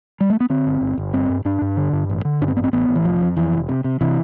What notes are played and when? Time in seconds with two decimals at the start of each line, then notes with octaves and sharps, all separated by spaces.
0.21 G3
0.30 A3
0.40 B3
0.50 D3 C4
0.67 G1
0.81 G1
0.98 G1
1.14 G2 C4
1.29 G2
1.45 G2 D4
1.62 G2
1.77 D3
1.93 G2
2.09 A1
2.25 D3
2.41 G2 D4
2.48 C4
2.57 A1 B3
2.64 C4
2.73 A1 B3
2.89 A1
2.95 E3
3.05 F1 F3
3.22 F2
3.37 F2 E3
3.53 F1
3.69 C3
3.84 C3
4.01 C3 E3